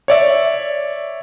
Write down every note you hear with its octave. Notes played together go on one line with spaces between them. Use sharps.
C#5 D5 E5